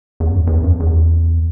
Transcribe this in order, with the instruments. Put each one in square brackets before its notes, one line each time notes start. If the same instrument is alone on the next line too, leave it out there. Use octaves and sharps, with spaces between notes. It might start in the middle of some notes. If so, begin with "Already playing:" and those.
[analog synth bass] E2
F#2
E2
F#2
E2